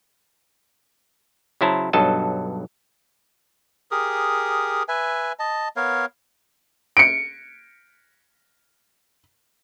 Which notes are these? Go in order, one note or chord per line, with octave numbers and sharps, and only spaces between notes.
C#3 F#3 E4 C5 A5 A#5
B1 G2 F#3 A4 D#5 A5
G4 G#4 A#4 D#6
B4 E5 G#5
D#5 A5
B3 A#4 C#5 F5
C#7 D7